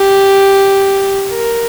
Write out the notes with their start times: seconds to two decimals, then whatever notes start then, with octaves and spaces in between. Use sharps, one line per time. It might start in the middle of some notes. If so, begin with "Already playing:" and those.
Already playing: G4
1.32 A#4